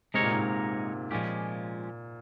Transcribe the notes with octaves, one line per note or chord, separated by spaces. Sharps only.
C3 G#3 D#4 A#4 C#5
A#2
G#2
A#2
A#2 F3 G#3 C#4 G4